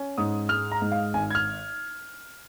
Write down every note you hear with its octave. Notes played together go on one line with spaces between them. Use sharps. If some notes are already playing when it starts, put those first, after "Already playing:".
Already playing: C#4
G#2 D#6
G#3 F6
A#5
G#2
F5
G#1 G#5
G#6
F6